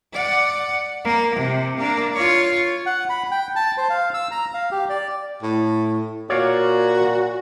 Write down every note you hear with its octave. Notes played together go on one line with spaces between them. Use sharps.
D5 F#5
A#3
C3
A#3 D4
F4 C#5
F#5
B5
G5
A5
C5
F5
E6
A#5
F5
G4
D5
A2
A#2 F#4 C#5 D5 F5